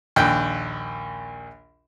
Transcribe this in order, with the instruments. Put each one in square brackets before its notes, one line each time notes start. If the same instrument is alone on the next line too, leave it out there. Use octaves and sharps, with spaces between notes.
[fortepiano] A#1 D#2 G5